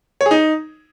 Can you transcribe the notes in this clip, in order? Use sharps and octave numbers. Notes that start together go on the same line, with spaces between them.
C#5
G#4
D#4